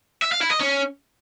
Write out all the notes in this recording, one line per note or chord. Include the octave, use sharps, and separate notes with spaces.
E5
F5
E4
D#5
C#4